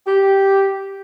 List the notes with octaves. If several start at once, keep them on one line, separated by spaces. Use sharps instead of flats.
G4